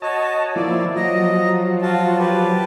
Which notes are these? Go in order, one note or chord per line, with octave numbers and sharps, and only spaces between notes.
F#4 C#5 D#5 A5
F3 A#3 E4 D5
F3 F#3 D#5 A#5
F4 F#4 A5
G4 B4 A5